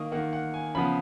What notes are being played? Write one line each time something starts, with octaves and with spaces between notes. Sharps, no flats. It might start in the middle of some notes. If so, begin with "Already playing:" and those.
Already playing: D#3 A#3 C#6 D#6
D#3 A#3 F#5
F#5
G#5
C#3 F3 B3 B5